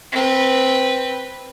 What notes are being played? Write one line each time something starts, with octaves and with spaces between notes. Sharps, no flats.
C4 B4